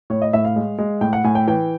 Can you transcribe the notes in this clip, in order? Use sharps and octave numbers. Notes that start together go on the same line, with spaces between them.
A2 C#5
D#5
A2 E5
F5
G#3
G#3
A2 G5
F#5
A2 G#5
G5
E3 G5